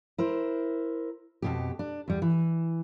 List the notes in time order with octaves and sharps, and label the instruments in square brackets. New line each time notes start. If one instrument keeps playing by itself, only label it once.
[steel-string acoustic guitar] E4 A#4 C5
F2 B2 G4
D4
E2 G3
E3